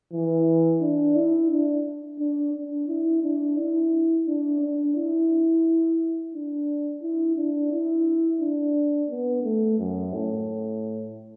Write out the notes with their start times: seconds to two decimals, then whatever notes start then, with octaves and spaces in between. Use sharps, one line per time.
0.13 E3
0.81 D4
1.16 E4
1.51 D4
2.19 D4
2.54 D4
2.88 E4
3.23 D4
3.58 E4
4.27 D4
4.61 D4
4.96 E4
6.34 D4
7.02 E4
7.37 D4
7.72 E4
8.41 D4
9.10 B3
9.44 A3
9.79 F#2
10.13 A2